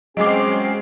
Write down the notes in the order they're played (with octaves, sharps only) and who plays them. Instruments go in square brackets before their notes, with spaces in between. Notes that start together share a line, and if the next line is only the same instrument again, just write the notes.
[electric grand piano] F#3 G#3 [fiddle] C4 F5 [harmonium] C#4 G#4 [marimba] D#5 D6